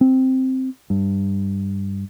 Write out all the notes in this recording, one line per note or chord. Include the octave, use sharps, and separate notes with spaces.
C4
G2